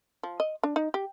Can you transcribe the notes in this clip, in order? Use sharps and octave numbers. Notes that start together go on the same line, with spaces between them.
F3
D#5
D4
D#4
G4